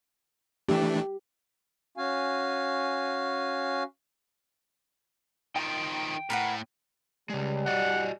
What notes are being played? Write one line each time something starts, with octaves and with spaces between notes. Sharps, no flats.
E3 A3 D4 G4
C#4 F#4 F5 G#5
D#3 F3 G5
A2 A#4 B4 F#5
C#3 G3 G#3
F#4 D5 D#5 F#5